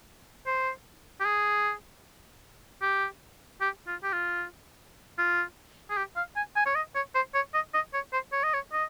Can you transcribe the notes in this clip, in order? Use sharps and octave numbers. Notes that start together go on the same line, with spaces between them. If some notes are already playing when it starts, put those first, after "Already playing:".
C5
G4
G#4
G4
G4
F4
G4
F4
F4
G#4
G4
F5
G#5
G#5
C#5
D#5
C#5
C5
C#5
D#5
D#5
C#5
C5
C#5
D#5
C#5
D#5